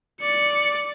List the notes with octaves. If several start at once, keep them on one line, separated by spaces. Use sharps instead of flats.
D5 C#7